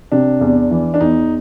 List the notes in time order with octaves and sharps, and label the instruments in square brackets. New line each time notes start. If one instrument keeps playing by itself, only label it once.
[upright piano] C3 [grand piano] D4
[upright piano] E2
E3
[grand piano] D4
[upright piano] E2 [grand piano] D#4